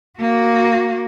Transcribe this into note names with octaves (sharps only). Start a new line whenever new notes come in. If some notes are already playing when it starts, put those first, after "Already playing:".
A#3 F#4